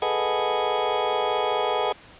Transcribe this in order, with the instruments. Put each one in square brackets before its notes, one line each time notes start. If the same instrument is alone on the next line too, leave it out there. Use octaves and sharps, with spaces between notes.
[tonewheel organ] G#4 A4 B4 D#5 F#5 G#6